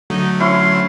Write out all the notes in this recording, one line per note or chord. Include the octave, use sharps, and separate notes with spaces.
D3 F#3 A3 D#4
C#4 E4 C5 C6